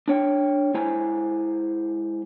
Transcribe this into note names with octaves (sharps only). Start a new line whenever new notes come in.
D4 C#5 G5
G#3 E4 C5 G#5 A#5